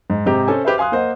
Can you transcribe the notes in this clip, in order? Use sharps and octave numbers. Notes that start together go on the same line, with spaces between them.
G#2
G#2 C3 G4 A#5
C#4 A4 C5 G#5
G4 B4 C5 E5
F5 G#5 C6 D#6 F#6
A#3 C5 D#5 F#5